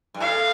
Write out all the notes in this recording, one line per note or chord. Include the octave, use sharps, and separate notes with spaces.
G2
A2 F5